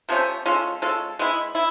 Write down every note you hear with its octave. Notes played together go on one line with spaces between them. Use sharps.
C3 F3 A3 C#4
G#3 C#4 F4 A4
G#3 C#4 F4 A4
G#3 B3 E4
E4